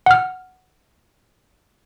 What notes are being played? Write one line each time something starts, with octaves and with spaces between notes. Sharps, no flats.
F#5 F6